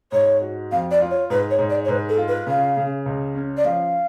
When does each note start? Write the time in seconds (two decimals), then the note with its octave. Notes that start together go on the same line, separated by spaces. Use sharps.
0.12 G#2 C#5
0.41 F#4
0.71 F2 F5
0.91 D5
1.00 F4
1.10 C#5
1.30 G#2 B4
1.50 C#5
1.59 G#2
1.69 D5
1.84 C#5
1.88 G#2 B4
2.08 A4
2.17 F4
2.28 B4
2.47 C#3 F5
2.77 C#3
3.06 C#2
3.35 C#4
3.57 D5
3.64 F3 F5